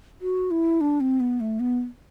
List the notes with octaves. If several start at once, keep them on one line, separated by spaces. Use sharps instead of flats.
F#4
E4
D4
C4
B3
A3
B3